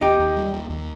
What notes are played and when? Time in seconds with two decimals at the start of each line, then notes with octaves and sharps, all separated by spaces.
0.01 D#2 D#4 G4
0.19 D#2
0.36 G3
0.53 D#2
0.70 D#2